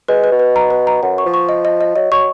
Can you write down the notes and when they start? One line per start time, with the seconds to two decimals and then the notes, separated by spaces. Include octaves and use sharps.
0.08 G#3 B4
0.24 B4
0.32 B2
0.39 B4
0.56 A#5
0.70 B4
0.87 A#5
1.03 F#2 F#5
1.18 C#6
1.26 F3
1.34 C#6
1.49 D#5
1.65 D#5
1.81 D#5
1.96 F#3 D#5
2.12 F#3 C#6